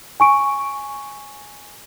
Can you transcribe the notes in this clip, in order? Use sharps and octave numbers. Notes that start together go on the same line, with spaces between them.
G#5 C#6 D7